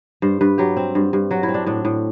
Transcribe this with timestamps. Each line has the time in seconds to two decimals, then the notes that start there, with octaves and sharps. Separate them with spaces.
0.22 G2 C5
0.41 G2 B4
0.58 F#3 G4
0.77 C4
0.95 G2
1.13 G2
1.31 F#3 F#4
1.43 E4
1.48 C4
1.54 D4
1.66 A2 D4
1.85 A2